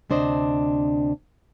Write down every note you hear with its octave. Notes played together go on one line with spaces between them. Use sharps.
D2 C3 D4 C5 D5 D#5